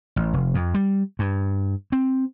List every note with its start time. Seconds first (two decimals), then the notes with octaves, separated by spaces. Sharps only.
0.16 A1
0.33 F1
0.55 F2
0.74 G3
1.19 G2
1.92 C4